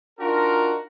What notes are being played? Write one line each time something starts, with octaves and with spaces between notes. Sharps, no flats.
D4 D#4 F4 F#4 A#4